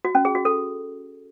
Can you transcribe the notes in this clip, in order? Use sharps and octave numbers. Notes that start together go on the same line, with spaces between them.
F#4
C#4
G#4
F#4
A4